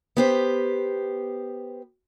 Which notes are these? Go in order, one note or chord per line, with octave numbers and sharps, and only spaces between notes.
B3 G4 C5